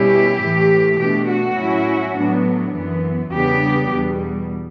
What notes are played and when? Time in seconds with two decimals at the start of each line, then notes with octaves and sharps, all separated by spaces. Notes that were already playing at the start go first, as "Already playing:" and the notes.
Already playing: B2 G3 C#4 E4 G4
0.40 A2 E3 A3
0.99 B2 A3 D4 G4
1.28 F#4
1.58 A2 F#3 C#4 E4
2.16 A2 F#3 B3 D4
2.74 F#2 E3 B3
3.32 E2 C#3 G3 B3 D4 G4
3.91 E2 B2 G3